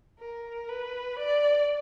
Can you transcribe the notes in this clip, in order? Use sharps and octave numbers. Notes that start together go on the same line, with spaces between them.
A#4
B4
D5